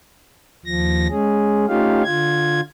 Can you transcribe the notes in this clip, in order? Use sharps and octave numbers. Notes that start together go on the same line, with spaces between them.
D#2 F3 A#6
G#3 C#4 G#4
A3 C#4 D#4 F4 G4 F5
D3 F4 G#6